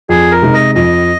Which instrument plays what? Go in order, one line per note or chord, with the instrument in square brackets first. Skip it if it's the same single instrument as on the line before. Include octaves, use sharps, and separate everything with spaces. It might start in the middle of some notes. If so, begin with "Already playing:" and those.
[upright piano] F2 [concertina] G#4
[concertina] A#4
[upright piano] C3 G#3 D#4
[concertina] D#5
[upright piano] F2 [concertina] D#5